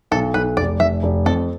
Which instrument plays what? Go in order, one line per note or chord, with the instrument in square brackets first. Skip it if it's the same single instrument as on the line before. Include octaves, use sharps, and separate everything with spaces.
[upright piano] B1 [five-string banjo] A4
[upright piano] B1 [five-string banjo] B4
[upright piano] F1 [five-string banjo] D5
[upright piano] F1 [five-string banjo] E5
[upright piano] F1
[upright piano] F2 [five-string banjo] A4